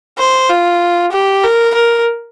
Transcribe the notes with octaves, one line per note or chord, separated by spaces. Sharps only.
C5
F4
G4
A#4
A#4